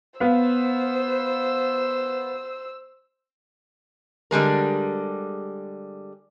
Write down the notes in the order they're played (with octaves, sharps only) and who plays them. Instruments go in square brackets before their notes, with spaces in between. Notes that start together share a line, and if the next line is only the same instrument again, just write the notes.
[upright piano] B3 F5 [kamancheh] C5 E6
[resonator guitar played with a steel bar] D3 G3 G#3 A#4